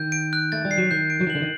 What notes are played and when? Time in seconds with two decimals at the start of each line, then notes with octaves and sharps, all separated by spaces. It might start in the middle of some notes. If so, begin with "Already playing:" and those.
Already playing: D#3 G6
0.12 D7
0.33 F#6
0.52 A3 A6
0.65 G3
0.71 C7
0.78 F#3
0.91 D#3 G6
1.10 D7
1.21 F#3
1.27 D#3
1.30 F#7
1.35 D3
1.42 D#3